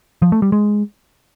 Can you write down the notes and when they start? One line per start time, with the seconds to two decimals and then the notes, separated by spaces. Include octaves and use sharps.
0.22 F3
0.32 A3
0.42 G3
0.52 G#3